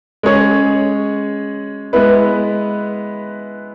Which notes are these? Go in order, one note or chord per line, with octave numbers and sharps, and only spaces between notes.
G#3 C#4 G#4 C#5
G#3 B3 E4 B4